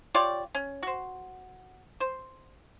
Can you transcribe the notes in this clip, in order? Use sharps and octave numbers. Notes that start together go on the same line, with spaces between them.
F4 G4 C#5 D5
C#4
F#4 C5
C5